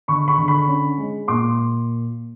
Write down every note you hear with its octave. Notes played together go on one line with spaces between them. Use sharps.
D3 B5 C#6
B5 C#6
D3
B5 C#6
C#4
G#3
A#2 C6 D6